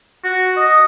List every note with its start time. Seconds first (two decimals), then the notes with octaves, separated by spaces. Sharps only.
0.24 F#4
0.56 D#5